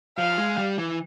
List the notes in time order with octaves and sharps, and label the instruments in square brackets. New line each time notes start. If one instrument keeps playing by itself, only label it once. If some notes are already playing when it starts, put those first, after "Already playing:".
[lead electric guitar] F3 [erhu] F5
[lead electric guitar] G#3
G3
E3